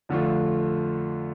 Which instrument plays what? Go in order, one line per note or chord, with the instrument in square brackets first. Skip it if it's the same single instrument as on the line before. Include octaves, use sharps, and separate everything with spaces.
[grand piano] F2 D3 A3 D4 F4